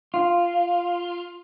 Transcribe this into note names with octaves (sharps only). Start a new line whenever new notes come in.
F4